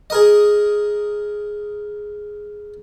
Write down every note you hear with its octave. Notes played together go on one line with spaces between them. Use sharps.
G#4 A#4 D#5